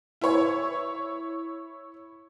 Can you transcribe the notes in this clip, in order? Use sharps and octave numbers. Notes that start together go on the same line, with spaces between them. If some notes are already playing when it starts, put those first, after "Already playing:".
E4 C#5